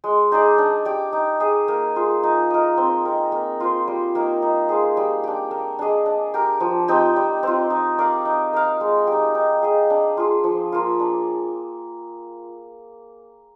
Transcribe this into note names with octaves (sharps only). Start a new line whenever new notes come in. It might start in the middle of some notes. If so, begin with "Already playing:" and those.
G#3
D#4 G#4 D5
D4
G4 D5
D#4
G#4 D#5
A#3
F4 G#4
D#4
A#4 D#5
C4
D#4 A#4
A#3
F4 C5
G3
A#3 D#4
D#4
G#4 C5 F5
G3
D4 G4
A#3
D4 G#4 D#5
D4
G4 A#4
F3
C4 D#4 G4
G3
C4 F4
D#4
A#4 D5 F5
D#4
A#4 F5
G#3
D#4 G4
D#4
G#4 D#5
D4
F4 G#4
F3
A#3 F4
D4